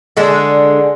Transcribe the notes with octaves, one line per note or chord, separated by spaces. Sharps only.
D3 G#3 D4